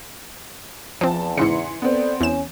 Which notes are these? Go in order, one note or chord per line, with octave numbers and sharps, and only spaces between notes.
E2 F3 C4 A5
G#2 C#3 E3 C6 C#7
B3 C4 A4 D5
E2 C#4 E7